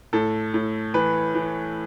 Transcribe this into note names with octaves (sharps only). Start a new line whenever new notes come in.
A2 A4
A2
E3 B4
E3